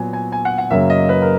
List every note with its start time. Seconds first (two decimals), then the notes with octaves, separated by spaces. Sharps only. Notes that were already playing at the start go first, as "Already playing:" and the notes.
Already playing: A#2 F#3 B3 G#5
0.13 G#5
0.32 G#5
0.45 F#5
0.58 F#5
0.70 F#2 C#3 F#3 A#3 E5
0.90 D#5
1.09 B4
1.22 A#4